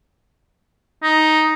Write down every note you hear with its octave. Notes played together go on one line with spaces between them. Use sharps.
D#4